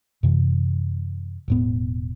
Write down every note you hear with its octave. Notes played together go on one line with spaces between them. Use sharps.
F#2 C3 E3
E1 A2 B3